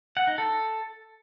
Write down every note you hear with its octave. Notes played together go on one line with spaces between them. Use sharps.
F#5
D#4
A4